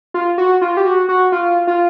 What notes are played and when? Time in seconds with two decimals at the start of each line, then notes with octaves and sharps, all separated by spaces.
0.14 F4
0.38 F#4
0.61 F4
0.77 G4
0.85 F#4
1.09 F#4
1.32 F4
1.67 F4